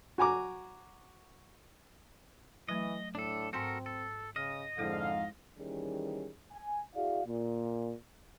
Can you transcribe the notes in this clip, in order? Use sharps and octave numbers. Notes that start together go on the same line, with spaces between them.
F#4 G#5 A#5 D6
E3 F#3 A3 D#5
A2 D4 A4
G#2 C4 F#4 A4 A#4 C6 G6
A4
C#3 D#5 F6
F2 G#2 D3 G#3 E4 A4 F5
D#2 D#3 E3 G3 C#4 G#4
G#5
E4 F#4 G#4 D5 F5
A#2